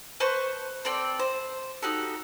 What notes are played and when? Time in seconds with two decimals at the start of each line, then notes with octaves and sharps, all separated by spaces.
0.20 B4 C5 A5 C#6
0.85 C4 A4 D5 G5
1.19 C5
1.82 D#4 F#4 G4 A4